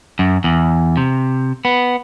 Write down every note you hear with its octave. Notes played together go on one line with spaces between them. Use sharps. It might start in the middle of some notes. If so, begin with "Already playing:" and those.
F#2
E2
C3
B3